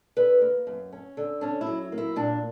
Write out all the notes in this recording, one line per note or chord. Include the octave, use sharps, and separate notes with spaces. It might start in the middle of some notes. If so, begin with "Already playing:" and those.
D3 B4
A#3
F#2
C#4
D3
C#4 D4
E4
F#3
A#3
E4
A#2 D4